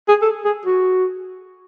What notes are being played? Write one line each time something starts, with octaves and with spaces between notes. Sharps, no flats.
G#4
A4
G#4
F#4